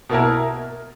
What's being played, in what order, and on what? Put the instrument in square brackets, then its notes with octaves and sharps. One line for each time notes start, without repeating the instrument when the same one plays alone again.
[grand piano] B2 A#3 E4 A#4